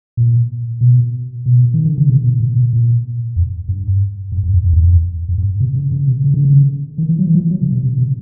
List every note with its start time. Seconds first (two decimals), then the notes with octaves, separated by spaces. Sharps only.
0.17 A#2
0.81 B2
1.46 B2
1.74 D#3
1.86 D3
1.98 C#3
2.10 C3
2.24 B2
2.40 A#2
2.56 B2
2.73 A#2
3.36 F2
3.68 G2
4.32 G2
4.43 F#2
4.54 F2
4.64 F2
4.73 E2
4.83 F2
5.28 F#2
5.38 G2
5.60 C3
5.75 C#3
5.92 C#3
6.08 C3
6.24 C#3
6.34 D3
6.45 C#3
6.98 D#3
7.09 E3
7.19 F#3
7.27 E3
7.35 F3
7.51 F#3
7.62 C#3
7.73 C3
7.84 C3
7.98 C3